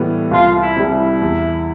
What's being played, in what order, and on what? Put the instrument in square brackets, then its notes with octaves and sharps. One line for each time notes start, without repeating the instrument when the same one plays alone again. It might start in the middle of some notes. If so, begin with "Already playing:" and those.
Already playing: [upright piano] A2 E3 G3 B3
[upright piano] C2 [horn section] F4
[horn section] E4
[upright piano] C3 G3
[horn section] E4
[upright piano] E2